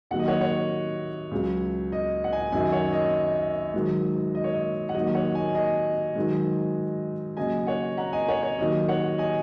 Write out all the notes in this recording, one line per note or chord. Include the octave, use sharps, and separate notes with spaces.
D#2 D#3 F#3 F#5
D#5
C#5 F#5
C#5 F#5
C#2 C#3 F#3
D#5
F#5
D#5 G#5
F#2 D#3 F#3 D#5 G#5
C#5 F#5
D#5
G#2 D#3 F#3
D#5
C#5
D#5
F#5
D#2 D#3 F#3 D#5
C#5 F#5
D#5 G#5
D#5 G#5
G#2 D#3 F#3
D#2 C#3 F#3 D#5 G#5
C#5 F#5
F#5 A#5
D#5 G#5
C#5 F#5
C#5
D#2 D#3 F#3 D#5
C#5 F#5
D#5 G#5